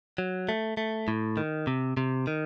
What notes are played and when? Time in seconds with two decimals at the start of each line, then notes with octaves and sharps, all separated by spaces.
0.18 F#3
0.49 A3
0.77 A3
1.08 A2
1.37 D#3
1.67 C3
1.97 C3
2.27 D#3